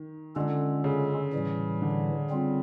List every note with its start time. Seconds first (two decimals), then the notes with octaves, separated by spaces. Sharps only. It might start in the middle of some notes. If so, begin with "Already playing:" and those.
Already playing: D#3
0.36 D3 G#3 C#4 F4 A4
0.84 C#3
1.33 A2 E3 G3
1.82 D3
2.30 G3 C4 F4